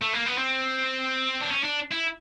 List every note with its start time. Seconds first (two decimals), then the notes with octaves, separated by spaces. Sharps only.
0.02 A3
0.13 A#3
0.26 B3
0.38 C4
1.40 D4
1.50 C#4
1.63 D4
1.91 E4